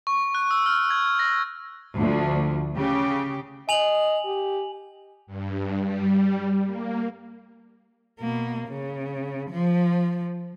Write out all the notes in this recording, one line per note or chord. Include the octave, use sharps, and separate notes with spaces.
C#6
F#6
E6
F6
G#6
A#6
D2 F3
C#3 G4
D#5 G#5 F7 F#7
G4
G2
G3
A#3
B2 A#3
C#3
F3